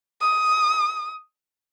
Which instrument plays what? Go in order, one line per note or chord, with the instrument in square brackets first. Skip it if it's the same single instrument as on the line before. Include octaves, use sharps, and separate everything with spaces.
[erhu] D#6